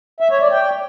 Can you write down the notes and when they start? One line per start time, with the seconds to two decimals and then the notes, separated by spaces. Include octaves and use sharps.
0.20 E5
0.31 C#5
0.41 D5
0.52 G5